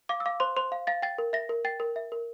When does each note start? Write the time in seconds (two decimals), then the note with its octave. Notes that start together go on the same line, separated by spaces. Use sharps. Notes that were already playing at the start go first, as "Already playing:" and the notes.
0.09 F5 D6
0.20 E6
0.26 F5 D6
0.40 C5 C6
0.56 C5 C6
0.72 F5
0.87 F5 A6
1.02 G5 A6
1.18 A#4
1.33 E5 A#6
1.49 A#4
1.65 G5 A6
1.80 A#4
1.96 E5
2.12 A#4